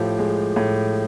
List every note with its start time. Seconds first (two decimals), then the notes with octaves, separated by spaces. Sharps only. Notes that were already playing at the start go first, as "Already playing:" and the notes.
Already playing: A2 F3 G4
0.19 G#3
0.56 A2